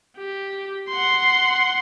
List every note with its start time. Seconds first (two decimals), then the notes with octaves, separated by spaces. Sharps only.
0.18 G4
0.89 F#5 C6